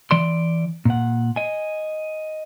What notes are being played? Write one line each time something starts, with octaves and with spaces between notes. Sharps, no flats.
E3 D5 C6
A#2 F#5
D#5 G#5